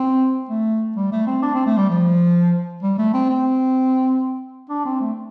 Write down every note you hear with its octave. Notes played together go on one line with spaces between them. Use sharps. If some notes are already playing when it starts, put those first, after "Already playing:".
Already playing: C4
A3
G3
A3
C4
D4
C4
A3
G3
F3
G3
A3
C4
C4
D4
C4
A3